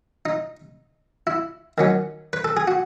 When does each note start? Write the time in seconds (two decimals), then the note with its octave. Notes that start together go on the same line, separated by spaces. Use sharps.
0.26 D#4
1.27 E4
1.78 D#3 F#3 C#4
2.33 B4
2.44 A4
2.57 G#4
2.68 F#4